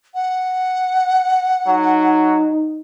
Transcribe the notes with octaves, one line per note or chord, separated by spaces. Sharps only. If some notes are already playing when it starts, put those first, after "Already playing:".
F#5
F#3 D#4